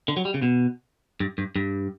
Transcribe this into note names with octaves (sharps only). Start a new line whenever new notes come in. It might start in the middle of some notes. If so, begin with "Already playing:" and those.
D3
F#3
G3
C#3
B2
G2
G2
G2